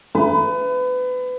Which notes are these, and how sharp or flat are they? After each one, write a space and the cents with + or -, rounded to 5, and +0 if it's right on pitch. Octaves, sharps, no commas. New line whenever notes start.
B4 +30